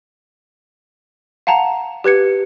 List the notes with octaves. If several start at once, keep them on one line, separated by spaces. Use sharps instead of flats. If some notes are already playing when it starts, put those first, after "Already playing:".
F5 F#5 A5 A#5
G4 B4 G#6 C#7